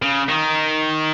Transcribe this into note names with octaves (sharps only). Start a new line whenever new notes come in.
C#3
D#3